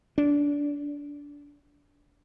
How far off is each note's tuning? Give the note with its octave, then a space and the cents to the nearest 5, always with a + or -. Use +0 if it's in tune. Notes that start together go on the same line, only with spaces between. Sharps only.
D4 -20